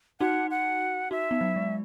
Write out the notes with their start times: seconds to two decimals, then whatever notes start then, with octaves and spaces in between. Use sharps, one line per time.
0.20 D#4 F#4 F#5
0.51 F#5
1.11 D#4 F#4 E5
1.31 B3 D#4
1.41 F#3
1.56 G#3